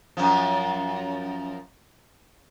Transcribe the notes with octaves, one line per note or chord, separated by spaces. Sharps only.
F#2 F3